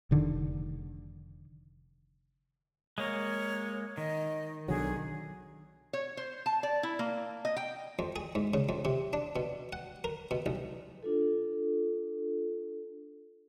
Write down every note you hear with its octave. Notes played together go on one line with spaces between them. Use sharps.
F1 D3 D#3
G#3 A#3 A#4 C#5
D#3 D#5
B1 D3 F#3 G#4
C#5
C5
A5
D5
E4
A#3
D#5
G5
F2
G#4
G#2
C#3
F2
C3
D4
B2
F#5
A#4
B2
B1
D4 F4 A4